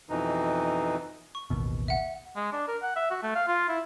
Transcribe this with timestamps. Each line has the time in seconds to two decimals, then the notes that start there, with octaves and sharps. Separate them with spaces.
0.09 F2 B2 E3 D#4
1.35 C#6
1.50 A1 D#2 B2
1.88 E5 F#5
2.36 G#3
2.52 D4
2.68 A#4
2.82 F#5
2.96 E5
3.10 F#4
3.23 A3
3.35 F5
3.47 F4
3.68 E4